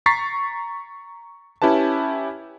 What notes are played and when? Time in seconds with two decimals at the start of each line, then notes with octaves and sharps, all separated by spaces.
0.06 A#5 C#6 A6 B6 C7
1.62 C#4 E4 G4 B4 A5